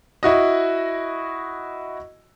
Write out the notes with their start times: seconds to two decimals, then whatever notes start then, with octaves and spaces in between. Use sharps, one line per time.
0.23 E4 F#4 D#5